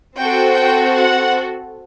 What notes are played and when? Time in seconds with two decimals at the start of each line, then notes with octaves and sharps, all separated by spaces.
0.16 C4 F#4 A4 G5
0.56 G5
0.96 F#5